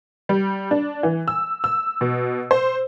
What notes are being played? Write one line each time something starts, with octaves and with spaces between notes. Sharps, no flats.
G3
D4
E3
E6
E6
B2
C5